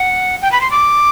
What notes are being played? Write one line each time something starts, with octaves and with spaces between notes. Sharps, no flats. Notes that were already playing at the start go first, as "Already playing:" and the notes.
Already playing: F#5
G5
B5
C6
D6